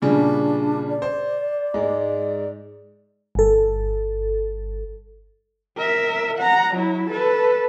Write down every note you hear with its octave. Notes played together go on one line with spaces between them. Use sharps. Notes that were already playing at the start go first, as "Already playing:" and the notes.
A#2 C#3 G3 D4
D5
C5
G#2 G#3
G1 A4
A#4 E5
F#5 A#5
F#3 E4
A4 B4